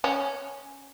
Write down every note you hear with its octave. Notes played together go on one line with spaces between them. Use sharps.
C#4